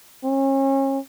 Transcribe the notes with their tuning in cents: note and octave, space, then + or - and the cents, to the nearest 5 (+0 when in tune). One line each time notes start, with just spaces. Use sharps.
C#4 -35